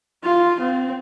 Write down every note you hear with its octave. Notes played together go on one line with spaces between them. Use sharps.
F4
C4